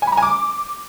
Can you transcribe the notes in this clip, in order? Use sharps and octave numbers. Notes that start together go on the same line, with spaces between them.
G#5
B5
A#5
G#5
D6